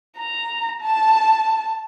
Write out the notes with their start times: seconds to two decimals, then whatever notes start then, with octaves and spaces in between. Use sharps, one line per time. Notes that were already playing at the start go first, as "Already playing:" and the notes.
0.17 A#5
0.81 A5